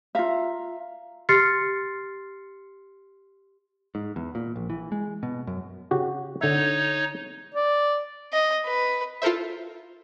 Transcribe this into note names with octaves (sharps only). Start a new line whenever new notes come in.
F4 E5 F5 A#5
G4 C6 F6 A6 C7 C#7
G#2
E2
A#2
A#1
E3
G#3
B2
F#2
C#3 F#4 G4
D3 D#4 C#5 E5
D5
D#5
B4
F4 A4 A#4 C5 E5